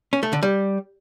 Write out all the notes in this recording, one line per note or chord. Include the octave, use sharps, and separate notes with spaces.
C#4
A3
D3
G3